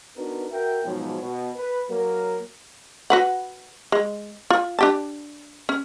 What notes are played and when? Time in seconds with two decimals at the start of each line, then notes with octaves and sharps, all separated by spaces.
0.16 B3 D4 D#4 F#4 A#4 B4
0.50 F#4 A#4 E5 G5
0.84 G#2 B2 F3 F#3
1.21 B2
1.56 B4
1.90 F#3 A#3 A#4
3.10 F#4 B4 F#5
3.92 G#3
4.50 F4
4.79 D4 G4 A5
5.69 C#4